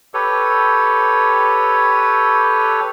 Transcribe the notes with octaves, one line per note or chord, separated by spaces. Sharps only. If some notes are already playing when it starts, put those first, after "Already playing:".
G4 A4 B4 C#5